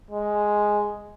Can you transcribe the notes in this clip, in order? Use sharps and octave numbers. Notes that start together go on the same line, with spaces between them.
G#3